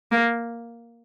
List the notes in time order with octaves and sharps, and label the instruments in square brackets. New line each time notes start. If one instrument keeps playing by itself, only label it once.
[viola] A#3